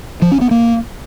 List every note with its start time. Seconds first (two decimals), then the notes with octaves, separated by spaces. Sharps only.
0.22 F3
0.32 C#4
0.41 B3
0.51 A#3